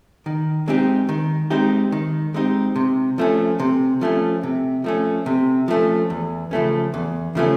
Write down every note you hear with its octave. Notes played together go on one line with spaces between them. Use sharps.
D#3
G#3 C4 D#4 G4
D#3
G#3 C4 D#4 G4
D#3
G#3 C4 D#4 G4
C3
F3 A3 C#4
C3
F3 A3 C#4
C3
F3 A3 C#4
C3
F3 A3 C#4
E2
C#3 F3 A3 C#4
E2
C#3 F3 A3 C#4